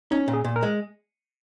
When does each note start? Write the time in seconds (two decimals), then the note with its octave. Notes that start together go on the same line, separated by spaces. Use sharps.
0.11 C#4 D#4
0.28 A#2
0.34 G#4
0.44 A#2
0.56 A#4
0.63 G#3